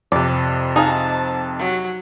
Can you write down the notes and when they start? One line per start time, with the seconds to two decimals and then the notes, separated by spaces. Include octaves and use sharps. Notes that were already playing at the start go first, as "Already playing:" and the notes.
0.12 F2 C3 D5
0.76 D#4 G#4 F5 A5
1.59 F#3